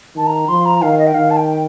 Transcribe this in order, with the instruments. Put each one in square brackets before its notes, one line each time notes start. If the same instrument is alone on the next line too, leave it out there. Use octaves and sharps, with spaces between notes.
[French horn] D#3 [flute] A5
[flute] A#5
[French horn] F3 [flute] C6
[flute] A#5
[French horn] D#3 [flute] F5
[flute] D#5
G5
[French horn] D#3 [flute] F5
[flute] A5
G5